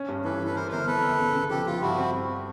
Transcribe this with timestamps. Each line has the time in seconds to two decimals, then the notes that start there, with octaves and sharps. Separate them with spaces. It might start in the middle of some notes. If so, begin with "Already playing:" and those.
Already playing: C#4
0.08 G2
0.24 E3 A4 B4
0.40 E3
0.47 B4
0.56 E3 A#4 C5
0.71 G1 A#4 C5
0.87 F2 A4 B4
1.03 G1
1.19 C#3
1.35 C#3
1.50 F3 G4 A4
1.66 F3 F4 G4
1.82 G2 E4 F#4
1.98 C4